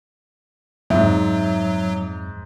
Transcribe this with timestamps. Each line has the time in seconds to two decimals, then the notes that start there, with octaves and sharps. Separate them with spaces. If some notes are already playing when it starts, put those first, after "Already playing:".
0.90 F2 G#2 F#3 E5